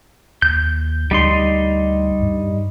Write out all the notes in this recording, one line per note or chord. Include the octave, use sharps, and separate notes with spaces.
D#2 G6
D2 G3 D#4 C6
G2